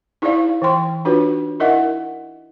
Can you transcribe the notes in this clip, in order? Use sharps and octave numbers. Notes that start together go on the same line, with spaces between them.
D#4 E4 G#4 C5 D5 F5
E3 G5 C6
D4 D#4 F4 F#4 B4 C#5
D#4 E4 A#4 D#5 E5 F#5